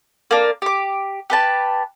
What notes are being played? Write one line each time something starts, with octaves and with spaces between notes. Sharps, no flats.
A#3 D4
G4 D6
G4 B4 A5